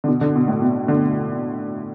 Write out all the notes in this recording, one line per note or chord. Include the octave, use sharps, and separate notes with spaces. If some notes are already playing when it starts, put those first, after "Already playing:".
D3
B2
D3
B2
A2
B2
D3